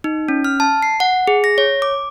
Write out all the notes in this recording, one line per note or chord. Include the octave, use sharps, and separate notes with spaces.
D#4
C#4
F6
A5
C7
F#5
G#4
A#6
C#5
D6